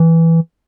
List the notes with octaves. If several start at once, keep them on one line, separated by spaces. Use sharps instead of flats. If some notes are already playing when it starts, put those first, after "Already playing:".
Already playing: E3